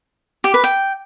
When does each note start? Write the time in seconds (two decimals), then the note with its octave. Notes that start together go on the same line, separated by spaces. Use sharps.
0.44 G4
0.54 B4
0.64 G5